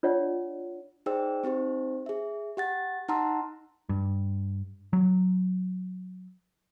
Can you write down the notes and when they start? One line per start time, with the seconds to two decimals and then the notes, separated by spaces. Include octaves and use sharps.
0.03 D4 F4 C#5 D5 F#5
1.06 D#4 G#4 C5 D5 G5 E6
1.44 C4 D#4 G4 C5
2.06 G#4 E5
2.57 G4 F#5 A6
3.08 D#4 F#5 A5 A#5 C6 E6
3.89 G2
4.93 F#3